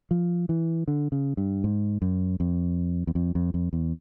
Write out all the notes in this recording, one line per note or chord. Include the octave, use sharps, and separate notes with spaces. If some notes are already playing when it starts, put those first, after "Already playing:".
F3
E3
D3
C#3
G2
G#2
F#2
F2
E2
F2
F2
F2
E2